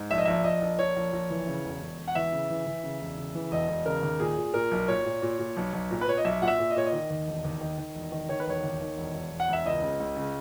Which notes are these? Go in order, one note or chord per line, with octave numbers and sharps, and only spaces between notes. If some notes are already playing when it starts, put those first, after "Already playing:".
Already playing: G#2
A#1 E5
D#5
A#1 E5
A#1 D#5
A#1
A#1 C#5
A#1
A#1
E3
C#3
E1
E1
E1
F#5
E3 E5
C#3
E3
E3
C#3
E1
C#3
E3
E1 D#5
E1
C#3 A#4
D#2
A#2 G#4
A#2
A#2 A#4
B1
A#2 C#5
A#2
A#2
A#2
B1
B1
A#2
B4
A#2 C#5
D#5
B1 E5
A#2 F#5
E5
A#2
D#5
A#2 C#5
D#5
D#3
D#2
E1
D#2
D#3
D#3
E1
D#3
D#3 C#5
B4
E1 C#5
D#2
D#3
E1
E1
E1
F#5
E1 E5
C#2 D#5
C#3
C#2
C#3